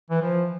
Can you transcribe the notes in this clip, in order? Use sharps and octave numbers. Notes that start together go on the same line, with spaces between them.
E3
F3